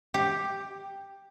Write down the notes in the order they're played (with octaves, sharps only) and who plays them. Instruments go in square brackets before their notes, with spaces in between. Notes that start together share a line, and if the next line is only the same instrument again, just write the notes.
[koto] G4